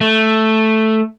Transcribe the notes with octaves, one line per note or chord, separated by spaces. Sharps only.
A3